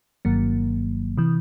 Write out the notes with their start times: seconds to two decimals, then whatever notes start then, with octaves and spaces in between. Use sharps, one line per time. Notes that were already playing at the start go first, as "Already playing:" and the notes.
0.25 G1 G2 D#3 F#3 A#3
1.17 C3 E3